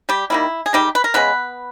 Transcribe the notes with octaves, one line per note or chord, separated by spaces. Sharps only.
G3 G4
D#3 G3 A#3 E4
G#4
D#3 G3 G#3 D#4 G4
B4
A#4
C#3 G#3 B3 C#4 B4